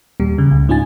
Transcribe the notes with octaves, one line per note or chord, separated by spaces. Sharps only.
D#2 A#2 G3
E2 C#3
C#2
G#2 C#4 D#4 F4 G#5 A6